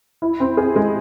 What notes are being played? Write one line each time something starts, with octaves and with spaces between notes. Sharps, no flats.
E4
C4
G#4
G#3